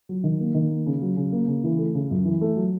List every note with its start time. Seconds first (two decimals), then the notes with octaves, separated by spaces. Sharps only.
0.09 F#3
0.24 D#3
0.40 A#3
0.55 D#3
0.70 A#3
0.86 C#3
1.02 F#3
1.17 C#3
1.32 A#3
1.48 C#3
1.64 E3
1.79 A3
1.94 C#3
2.11 F#2
2.25 E3
2.41 A3
2.56 F#3